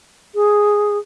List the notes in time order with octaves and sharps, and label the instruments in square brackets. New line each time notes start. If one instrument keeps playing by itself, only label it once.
[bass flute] G#4